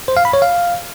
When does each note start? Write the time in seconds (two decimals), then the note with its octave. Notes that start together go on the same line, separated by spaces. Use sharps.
0.08 C5
0.17 F5
0.25 B5
0.33 C#5
0.42 F5